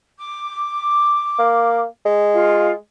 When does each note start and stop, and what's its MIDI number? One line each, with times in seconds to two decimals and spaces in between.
0.18 1.78 86
1.39 1.84 58
2.05 2.74 56
2.33 2.71 65
2.33 2.71 77